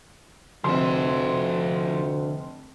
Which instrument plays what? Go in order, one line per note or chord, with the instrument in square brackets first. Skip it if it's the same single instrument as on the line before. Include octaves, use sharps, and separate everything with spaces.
[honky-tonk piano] F1 C6 [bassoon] D2 [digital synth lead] D3 [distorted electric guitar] F3 E5